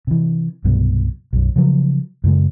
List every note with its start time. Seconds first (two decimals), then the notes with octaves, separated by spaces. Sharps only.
0.07 C3 E3
0.64 C2 G2 B2 F#3
1.33 B1 F#2
1.56 C#3 F3 F#3
2.24 F#2 C#3 G#3